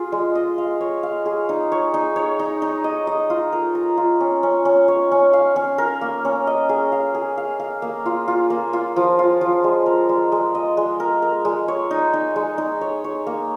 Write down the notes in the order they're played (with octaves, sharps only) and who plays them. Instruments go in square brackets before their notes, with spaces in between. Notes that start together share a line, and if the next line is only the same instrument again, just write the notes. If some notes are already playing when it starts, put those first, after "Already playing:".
Already playing: [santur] F4 G#4
G#3
D#5
F5
C#5
F5
G#4
D#4
C#5
D#4
C#5
D#4
D#4
D#5
D#5
F4
A#4
A#4
F4
C#4
C#4
C#4
C#5
C#4
F5
C#4
A#4
A#3
C#4
D#5
G#4
F5
G#4
F5
F5
A#3
F4
F4
A#3
F4
F3
F4
F3
G#3
A#4
G#3
G#3
D#5
G#3
A#4
A#4
G#3
C#5
D#4
D#4
G#3
D#4
C#5
C#5
A#3